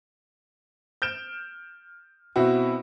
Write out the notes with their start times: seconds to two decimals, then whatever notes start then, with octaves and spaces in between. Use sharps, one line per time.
1.02 F6 G6 D7 E7
2.36 B2 C4 E4 F#4